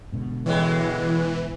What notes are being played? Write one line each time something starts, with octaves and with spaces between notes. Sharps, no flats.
G#2 B2 D3
A2 E3 F#3 G#3 B4